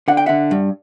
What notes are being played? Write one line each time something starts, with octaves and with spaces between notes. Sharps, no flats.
D3 F#5
G5
D3 E5 F#5
G2